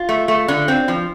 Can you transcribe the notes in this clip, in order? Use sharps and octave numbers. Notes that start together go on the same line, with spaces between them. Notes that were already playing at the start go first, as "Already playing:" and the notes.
Already playing: F4
A3
A3
D3
C4
F3